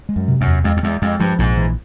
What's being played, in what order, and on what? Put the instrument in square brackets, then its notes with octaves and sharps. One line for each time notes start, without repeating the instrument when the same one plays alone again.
[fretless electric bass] G#3
[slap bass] F#2
[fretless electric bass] C3
[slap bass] F#2
[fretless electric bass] E2
[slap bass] F2 [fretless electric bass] G#3
[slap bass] F2
[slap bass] E2 [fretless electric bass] G#3
[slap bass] F2 [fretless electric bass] G#3
[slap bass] G2 [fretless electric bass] F3
[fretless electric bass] A#1 [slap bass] G#2
[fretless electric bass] E3